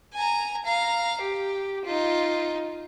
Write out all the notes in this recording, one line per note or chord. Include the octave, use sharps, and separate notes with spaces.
G#5 A#5
F5 A#5
G4
D#4 F4